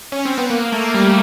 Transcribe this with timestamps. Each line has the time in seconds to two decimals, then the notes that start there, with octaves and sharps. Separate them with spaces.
0.12 C#4
0.25 C4
0.38 B3
0.50 A#3
0.72 A3
0.94 G3